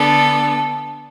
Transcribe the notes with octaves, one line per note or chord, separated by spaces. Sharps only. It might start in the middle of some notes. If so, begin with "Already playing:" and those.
Already playing: D3 B3 D4 A4